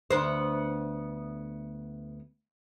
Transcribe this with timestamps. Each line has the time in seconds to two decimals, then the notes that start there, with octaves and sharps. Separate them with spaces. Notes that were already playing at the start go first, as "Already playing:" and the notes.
0.10 D2 B3 C5